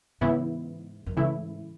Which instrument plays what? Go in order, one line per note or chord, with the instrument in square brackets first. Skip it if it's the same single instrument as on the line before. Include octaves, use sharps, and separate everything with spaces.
[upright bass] G#2 [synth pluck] C#3 E3 B3 E4
[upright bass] F#2
[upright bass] G#2 [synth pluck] C#3 E3 A3 E4